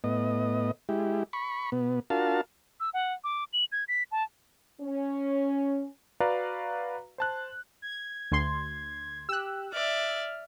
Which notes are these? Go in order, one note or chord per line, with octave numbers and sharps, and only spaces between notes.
A2 B3 D#5
G#3 E4 G4
B5 C#6
B2 B3
D4 F4 F#4 A#4 F5 A5
E6
F#5
D6
F#7
G#6
B6
A5
C#4
F#4 B4 D5 F5 A#5
C5 A5 F#6
G#6
D2 C6
G4 E6 F#6
D5 E5 F6